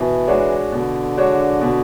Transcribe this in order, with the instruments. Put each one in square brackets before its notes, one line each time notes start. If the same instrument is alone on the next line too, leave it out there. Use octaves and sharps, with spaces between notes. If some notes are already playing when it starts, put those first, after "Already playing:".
Already playing: [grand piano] B2 [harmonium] E3
[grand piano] G#3 D4 F#4 C#5
[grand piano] B2 [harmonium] D3
[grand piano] G#3 D4 F#4 C#5
B2